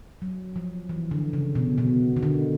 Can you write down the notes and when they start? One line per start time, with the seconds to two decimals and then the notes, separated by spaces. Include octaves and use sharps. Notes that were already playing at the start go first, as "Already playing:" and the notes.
0.22 F#3
0.56 F3
0.89 E3
1.11 D3
1.33 C#3
1.55 B2
1.78 B2
2.16 D#3
2.23 D3